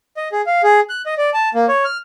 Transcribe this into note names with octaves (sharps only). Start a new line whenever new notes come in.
D#5
G#4
F5
G#4
F#6
D#5
D5
A5
A#3
C#5
F6